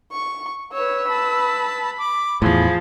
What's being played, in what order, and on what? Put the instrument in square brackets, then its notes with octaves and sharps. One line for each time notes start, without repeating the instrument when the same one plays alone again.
[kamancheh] C#6
[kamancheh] B4 E6 [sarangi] C#5
[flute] A5 [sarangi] B5
[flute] D6
[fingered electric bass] E2 A2 [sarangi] F3 [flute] G#4 [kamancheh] B5